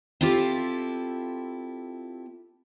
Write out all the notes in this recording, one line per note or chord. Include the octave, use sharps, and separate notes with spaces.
C4 E4 F4 G4 A4